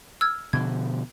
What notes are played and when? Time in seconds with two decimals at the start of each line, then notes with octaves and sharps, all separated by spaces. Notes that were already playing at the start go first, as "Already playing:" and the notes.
0.21 E6 F6 G#6
0.53 B2 D3 F3 G#6